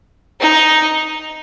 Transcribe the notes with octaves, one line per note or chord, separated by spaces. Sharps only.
D#4